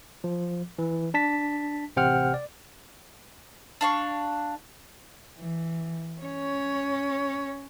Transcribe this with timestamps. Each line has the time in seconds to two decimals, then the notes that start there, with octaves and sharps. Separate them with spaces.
0.24 F3
0.79 E3
1.14 D4 A5 B6
1.96 A1 C3 C5 F#5 G5 F6
2.34 D5
3.81 D4 F5 C#6
5.38 E3
6.21 C#4 C#5